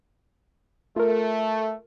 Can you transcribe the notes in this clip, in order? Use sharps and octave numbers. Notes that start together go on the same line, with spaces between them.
A3 F4 A#4